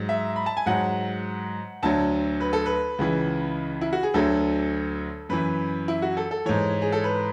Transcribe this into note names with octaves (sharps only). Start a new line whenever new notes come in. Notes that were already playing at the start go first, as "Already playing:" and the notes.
Already playing: G#2 F#3
E5
B5
A5
G#5
G#2 F#3 F#5
D2 D3 F#3 A5
B4
A4
B4
C#2 C#3 E3
E4
F#4
G#4
D2 D3 F#3 A4
F#2 E3 B4
E4
F#4
A4
A4
G#2 E3 C#5
G#4
A4
B4